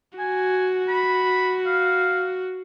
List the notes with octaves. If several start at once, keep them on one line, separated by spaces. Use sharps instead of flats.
F#4 G#5
B5
F5